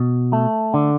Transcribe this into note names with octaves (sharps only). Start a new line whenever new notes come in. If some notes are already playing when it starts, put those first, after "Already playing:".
Already playing: B2
A3
D3